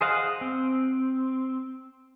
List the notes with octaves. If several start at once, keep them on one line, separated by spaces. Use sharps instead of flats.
G#4 C5 D#5 F5 F#5
C4